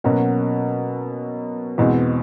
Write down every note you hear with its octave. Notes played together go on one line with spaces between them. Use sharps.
B2 F#3 A#3 C#4 F#4
E2 B2 G#3 C4